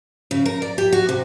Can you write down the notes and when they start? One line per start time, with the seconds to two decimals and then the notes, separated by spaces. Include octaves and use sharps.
0.31 C#3
0.46 A#4
0.62 D5
0.78 G4
0.92 F#4
1.09 C3